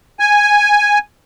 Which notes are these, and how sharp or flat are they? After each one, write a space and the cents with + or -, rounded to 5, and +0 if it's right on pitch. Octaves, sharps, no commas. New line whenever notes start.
G#5 -5